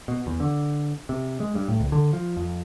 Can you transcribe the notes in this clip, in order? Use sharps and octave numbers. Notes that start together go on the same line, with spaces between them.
B2
E2
D3
C3
G#3
G2
A2
C#2
D3
F3
F2